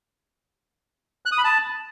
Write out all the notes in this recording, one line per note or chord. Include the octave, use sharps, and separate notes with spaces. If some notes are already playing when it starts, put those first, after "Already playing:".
F#6
D#6
B5
A5